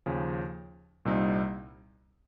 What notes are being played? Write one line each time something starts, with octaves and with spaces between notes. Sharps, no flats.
D#2 C#3 F3
C2 A#2 G3 C4 D#4